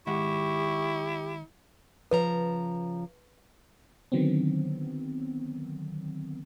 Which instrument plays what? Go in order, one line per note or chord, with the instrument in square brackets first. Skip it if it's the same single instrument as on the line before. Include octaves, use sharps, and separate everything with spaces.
[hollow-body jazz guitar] D#3 G#3 F#5 [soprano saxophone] E4 [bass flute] G4 [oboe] C#6
[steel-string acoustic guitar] C#3 F3 A#5 [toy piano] B4
[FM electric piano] D3 D#3 F#3 B3 C4